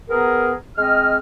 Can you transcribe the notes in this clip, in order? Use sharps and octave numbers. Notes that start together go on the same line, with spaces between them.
B3 G#4 A#4
G#3 C4 D#5 F6